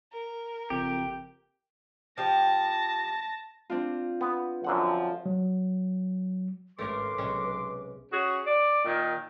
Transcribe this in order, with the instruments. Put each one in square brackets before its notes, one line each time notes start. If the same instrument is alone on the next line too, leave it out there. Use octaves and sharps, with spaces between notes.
[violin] A#4
[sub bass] F#1 [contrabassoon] F2 [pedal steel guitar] G4
[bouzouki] F3 G4 [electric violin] A5 A#6
[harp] C4 D4 F4
[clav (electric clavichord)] B3 B4
[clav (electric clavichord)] F#2 D3 F#5 [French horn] F3
[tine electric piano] F#3
[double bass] G#1 [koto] A3 C#4 A#4 [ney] B4 [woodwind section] C6 D6
[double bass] B1 [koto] C3 G#3 C#4
[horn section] C#4 F#4 G#4
D5
A#2 D#3